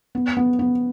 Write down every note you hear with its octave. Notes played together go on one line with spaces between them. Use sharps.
B3
B3
B3